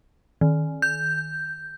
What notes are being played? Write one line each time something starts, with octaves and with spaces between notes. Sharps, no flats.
D#3
G6